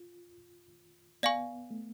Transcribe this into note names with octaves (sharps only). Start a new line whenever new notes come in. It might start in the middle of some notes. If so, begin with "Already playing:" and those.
Already playing: F4
B3 D5 F5 G#5 C#6
A3